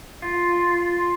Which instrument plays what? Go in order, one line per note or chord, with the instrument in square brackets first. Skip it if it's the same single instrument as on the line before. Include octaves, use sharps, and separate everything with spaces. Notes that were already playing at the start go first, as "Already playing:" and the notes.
[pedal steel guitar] F4